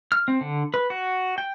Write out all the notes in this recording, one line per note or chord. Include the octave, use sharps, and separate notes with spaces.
F6
C4
D3
B4
F#4
G5